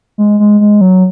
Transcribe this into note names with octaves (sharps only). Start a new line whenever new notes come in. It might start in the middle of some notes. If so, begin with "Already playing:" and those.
G#3
G#3
G#3
F#3